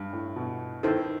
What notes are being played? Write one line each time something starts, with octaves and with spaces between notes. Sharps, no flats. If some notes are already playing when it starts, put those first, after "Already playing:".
Already playing: G2
A2
B2
D#3 E4 A4 C5